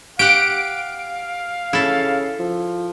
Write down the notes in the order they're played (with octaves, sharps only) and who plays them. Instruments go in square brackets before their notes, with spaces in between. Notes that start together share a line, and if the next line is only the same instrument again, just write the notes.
[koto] G4 F#5 [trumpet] F5 [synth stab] D7
[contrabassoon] C#3 [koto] E4 A4
[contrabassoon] F3